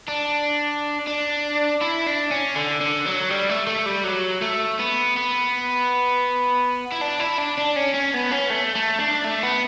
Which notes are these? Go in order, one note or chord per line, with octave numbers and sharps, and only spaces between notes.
D4
D4
E4
D4
C#4
D3
D3
F#3
G3
A3
A3
G3
F#3
A3
B3
B3
E4
D4
E4
D4
D4
C#4
C#4
B3
C#4
A3
A3
D4
A3
B3